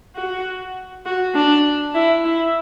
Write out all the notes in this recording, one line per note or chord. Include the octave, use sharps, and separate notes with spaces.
F#4
F#4
D4
E4
E4